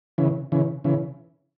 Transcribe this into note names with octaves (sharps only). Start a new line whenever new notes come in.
C#3 E3
C#3 E3
C#3 E3